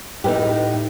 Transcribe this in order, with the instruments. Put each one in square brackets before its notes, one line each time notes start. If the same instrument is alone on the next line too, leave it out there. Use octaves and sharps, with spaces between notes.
[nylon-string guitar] A2 D#4 [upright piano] G4 B4